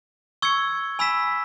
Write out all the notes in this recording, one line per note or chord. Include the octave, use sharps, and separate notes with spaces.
C#6 E6 G#6 C#7
G#5 B5 E6 B6 E7